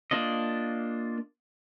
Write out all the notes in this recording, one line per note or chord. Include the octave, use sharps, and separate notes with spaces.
A#3 D4 F4 D#5